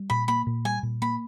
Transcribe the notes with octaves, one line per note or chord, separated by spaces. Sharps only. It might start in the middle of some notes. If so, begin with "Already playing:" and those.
Already playing: G3
A#2 B5
A#3 B5
A#2
G3 G#5
A#2
A#3 B5